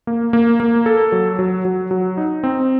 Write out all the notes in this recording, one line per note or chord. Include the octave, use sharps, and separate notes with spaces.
A#3
A#3
A#3
A4
F#3
F#3
F#3
F#3
D#4
C4